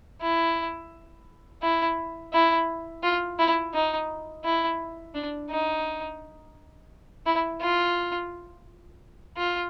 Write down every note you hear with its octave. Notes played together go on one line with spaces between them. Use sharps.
E4
E4
E4
F4
E4
D#4
E4
D4
D#4
E4
F4
F4